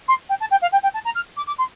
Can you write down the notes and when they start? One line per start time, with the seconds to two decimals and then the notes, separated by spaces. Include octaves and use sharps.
0.08 C6
0.29 G5
0.40 A5
0.51 G5
0.62 F5
0.72 G5
0.83 G5
0.94 A5
1.05 A#5
1.15 F6
1.37 D6
1.47 D6
1.58 C6